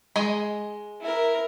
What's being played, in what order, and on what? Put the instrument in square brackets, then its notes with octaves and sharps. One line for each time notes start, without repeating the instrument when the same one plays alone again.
[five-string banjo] G#3 D#5 G#5
[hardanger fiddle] E4 A#4